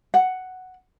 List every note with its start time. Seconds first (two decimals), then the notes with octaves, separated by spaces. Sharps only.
0.14 F#5